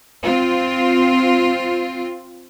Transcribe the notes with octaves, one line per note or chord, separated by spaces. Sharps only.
C4 F4